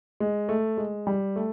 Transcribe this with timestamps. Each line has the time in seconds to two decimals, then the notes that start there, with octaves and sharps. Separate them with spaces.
0.20 G#3
0.49 A3
0.78 G#3
1.07 G3
1.36 A3